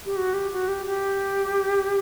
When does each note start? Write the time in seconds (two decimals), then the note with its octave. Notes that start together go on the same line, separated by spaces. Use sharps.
0.06 G4
0.17 F#4
0.34 G4
0.52 F#4
0.68 G4
0.86 G4